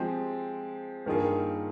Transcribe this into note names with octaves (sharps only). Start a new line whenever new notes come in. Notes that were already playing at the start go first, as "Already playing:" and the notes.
Already playing: F3 G#3 C4 G4
G2 D#3 A#3 F4 G#4